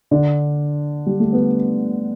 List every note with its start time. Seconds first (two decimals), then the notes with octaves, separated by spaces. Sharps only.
0.11 D3 D4
1.06 G3
1.20 A3
1.33 B3